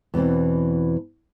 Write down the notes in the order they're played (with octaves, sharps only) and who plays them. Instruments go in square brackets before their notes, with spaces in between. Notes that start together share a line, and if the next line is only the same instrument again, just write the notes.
[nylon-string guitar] E2 B2 E3 C4